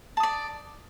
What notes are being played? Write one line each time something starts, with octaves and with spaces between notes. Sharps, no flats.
D5 A5 D#6